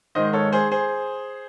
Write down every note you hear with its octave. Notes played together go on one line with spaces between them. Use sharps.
G#2 D#3 G#3 C5 D#5
A4 C#5
G#4 C5
G#4 C5